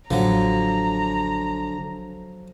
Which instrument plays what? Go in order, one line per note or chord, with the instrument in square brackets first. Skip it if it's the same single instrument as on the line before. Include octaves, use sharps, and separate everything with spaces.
[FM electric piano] A1 [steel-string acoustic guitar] D3 [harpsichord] F3 F#3 [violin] A#5